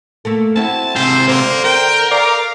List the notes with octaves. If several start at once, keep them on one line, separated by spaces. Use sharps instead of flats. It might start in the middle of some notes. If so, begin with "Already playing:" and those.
A3 A#3 A4
C4 E4 F#4 A5
G#2 C3 C5
D3 A#3 C5
A#4 G5
D5 F5